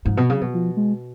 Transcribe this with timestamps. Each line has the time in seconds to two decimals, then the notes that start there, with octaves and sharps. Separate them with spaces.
0.06 G#2 F3
0.17 B2
0.29 C#3 F#3
0.41 B2
0.54 F3
0.77 G#3